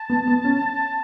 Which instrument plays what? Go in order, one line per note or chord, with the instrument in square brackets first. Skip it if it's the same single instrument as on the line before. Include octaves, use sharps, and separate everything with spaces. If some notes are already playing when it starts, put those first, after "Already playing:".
Already playing: [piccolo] A5
[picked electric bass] B3
B3
C#4